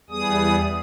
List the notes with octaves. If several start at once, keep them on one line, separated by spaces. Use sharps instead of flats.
E2 G3 B3 G#4 D#6